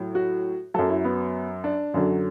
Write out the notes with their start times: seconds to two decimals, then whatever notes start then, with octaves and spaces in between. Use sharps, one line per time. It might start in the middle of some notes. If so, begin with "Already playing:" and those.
Already playing: A2 F#3
0.15 F#4
0.74 F#2 F#3 A4
0.89 E4
1.04 B3
1.64 D4
1.94 F#2 D3 F#3